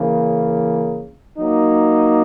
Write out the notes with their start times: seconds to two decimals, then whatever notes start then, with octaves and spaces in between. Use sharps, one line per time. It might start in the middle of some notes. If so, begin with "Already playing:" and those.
Already playing: C#3 E3 A#3
1.39 F#3 A#3 D#4